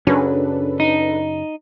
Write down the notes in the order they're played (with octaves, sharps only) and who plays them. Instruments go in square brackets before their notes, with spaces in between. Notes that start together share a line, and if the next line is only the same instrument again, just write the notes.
[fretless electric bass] F#2 C#3 F#3 [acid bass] C#4 [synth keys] D4 A4 B4
[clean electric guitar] D#4